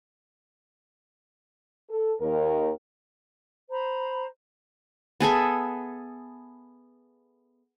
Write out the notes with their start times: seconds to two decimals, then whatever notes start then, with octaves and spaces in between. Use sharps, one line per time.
1.90 A4
2.20 D#2 A#4
3.69 C5 A#5 B5
5.20 B3 G#4 A4 E5